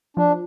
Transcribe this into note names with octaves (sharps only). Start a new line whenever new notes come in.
F3 D4